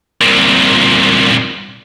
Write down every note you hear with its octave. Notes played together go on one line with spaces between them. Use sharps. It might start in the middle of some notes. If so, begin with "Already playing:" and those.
C2 A#2